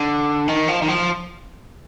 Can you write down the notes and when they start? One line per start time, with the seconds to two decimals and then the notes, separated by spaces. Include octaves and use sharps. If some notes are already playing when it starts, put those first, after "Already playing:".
Already playing: D3
0.48 D#3
0.68 F3
0.82 D#3
0.88 F3